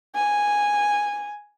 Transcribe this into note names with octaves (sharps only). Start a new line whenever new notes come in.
G#5